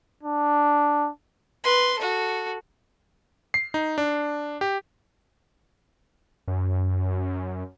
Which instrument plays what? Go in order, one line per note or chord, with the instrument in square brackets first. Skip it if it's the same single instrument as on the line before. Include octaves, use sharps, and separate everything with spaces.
[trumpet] D4
[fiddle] B4 C6
F#4 A4
[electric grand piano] C7
D#4
D4
G4
[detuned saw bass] F#2